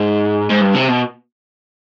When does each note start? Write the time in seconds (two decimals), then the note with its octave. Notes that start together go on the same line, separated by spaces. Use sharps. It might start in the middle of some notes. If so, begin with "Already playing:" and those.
Already playing: G#2
0.49 G#2
0.61 G2
0.74 C3
0.88 B2